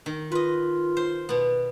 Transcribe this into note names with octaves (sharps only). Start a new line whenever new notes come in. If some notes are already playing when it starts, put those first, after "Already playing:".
D#3
F4 B4 D#5
C5
B2 B3